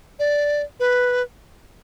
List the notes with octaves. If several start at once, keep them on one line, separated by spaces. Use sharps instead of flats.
D5
B4